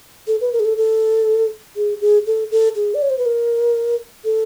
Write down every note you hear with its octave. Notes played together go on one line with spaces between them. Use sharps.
A4
B4
A#4
G#4
A4
A4
G#4
G#4
A4
A4
G#4
D5
C#5
C5
B4
A#4
A4